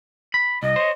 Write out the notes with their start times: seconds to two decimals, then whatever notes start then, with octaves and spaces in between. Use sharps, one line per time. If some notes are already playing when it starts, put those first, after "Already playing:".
0.34 B5
0.63 C2 D#5
0.76 C5 C#5